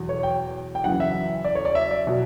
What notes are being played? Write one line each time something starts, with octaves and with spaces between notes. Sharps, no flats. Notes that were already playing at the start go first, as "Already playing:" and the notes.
Already playing: E2 B2 F#3
C#5
G5
G5
F#2 C#3 E3 F#5
E5
D5
C#5
D5
E5
D5
B2 F#3